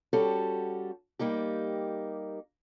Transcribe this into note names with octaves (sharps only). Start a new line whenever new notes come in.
G3 C#4 F#4 G4 A4
G3 A#3 D#4 G4